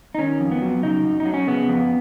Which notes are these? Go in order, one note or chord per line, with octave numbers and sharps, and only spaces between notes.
D#4
D#3 C#4
F2
B3
F#3
C#3 D#4
F#2
D#4
F#3
C#4
C#3 B3
F2